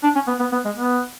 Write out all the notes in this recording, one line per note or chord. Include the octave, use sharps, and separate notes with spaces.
D4
C#4
B3
B3
B3
G#3
B3